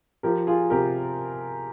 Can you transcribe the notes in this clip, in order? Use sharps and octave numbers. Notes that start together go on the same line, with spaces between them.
F3 G4 A#4
F4 G#4
C3 G4 A#4